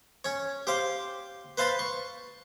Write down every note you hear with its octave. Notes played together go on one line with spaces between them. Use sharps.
C#4 C#5
G4 C5 F5
B4 C5 F5 A5 B5 C6
C#6